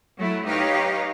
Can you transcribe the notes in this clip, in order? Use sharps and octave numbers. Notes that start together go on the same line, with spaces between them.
F#3 A3 E4
D#4 G4 B4 C#5 D#5 F5